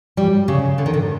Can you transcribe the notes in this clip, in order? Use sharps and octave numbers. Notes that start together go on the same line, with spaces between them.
G3
C#3
D3
D#3
D3